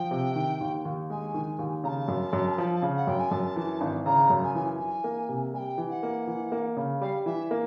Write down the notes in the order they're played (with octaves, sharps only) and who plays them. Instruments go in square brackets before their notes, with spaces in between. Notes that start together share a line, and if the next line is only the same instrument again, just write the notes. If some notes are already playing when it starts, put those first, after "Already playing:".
Already playing: [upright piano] F3 [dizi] G5
[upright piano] C3
D#3
D#2
D#2
[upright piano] G#3 [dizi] G#5
[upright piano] D#3
D#2
[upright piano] C#3 [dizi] A#5
[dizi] A5
[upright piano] F#2
F#2
F3
C#3
[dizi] F#5
[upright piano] F#2 [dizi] G5
[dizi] G#5
[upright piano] F#2 [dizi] A5
[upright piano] E3
G#1
[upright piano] C#3 [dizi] A#5
[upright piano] F#2
[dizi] G#5
[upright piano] E3
[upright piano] E3 [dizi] G#5
[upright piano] A#3
C3
[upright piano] G3 [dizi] G#5
[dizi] G5
[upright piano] E3
[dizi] F#5
[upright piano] A#3
E3
A#3
C#3
[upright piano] G3 [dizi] F5
[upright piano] E3 [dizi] E5
[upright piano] A#3